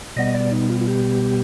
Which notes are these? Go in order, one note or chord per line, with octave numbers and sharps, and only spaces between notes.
B2 G3 B3 D#5
D5
D#4
F4
F4
G4